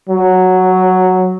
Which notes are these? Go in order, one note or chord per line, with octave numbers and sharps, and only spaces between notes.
F#3